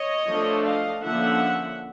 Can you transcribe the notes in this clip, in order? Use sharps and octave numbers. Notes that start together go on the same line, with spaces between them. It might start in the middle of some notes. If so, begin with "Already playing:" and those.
Already playing: C#5 D#5
F3 A3 D4
D#5 F5
D3 F3 A#3 C#4 E5 F#5